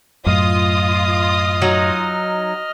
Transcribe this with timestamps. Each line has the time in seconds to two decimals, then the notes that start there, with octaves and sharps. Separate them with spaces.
0.26 F#2 A2 F4 D#5 D#6 F6
1.61 F#3 D#4